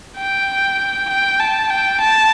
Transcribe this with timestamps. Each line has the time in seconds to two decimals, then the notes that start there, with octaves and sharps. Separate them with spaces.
0.17 G5
1.10 G5
1.40 A5
1.71 G5
2.01 A5